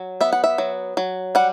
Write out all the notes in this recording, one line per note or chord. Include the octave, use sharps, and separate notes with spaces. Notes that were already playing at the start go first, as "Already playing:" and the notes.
Already playing: F#3
B3 E5
F#5
E5
F#3
F#3
G3 F#5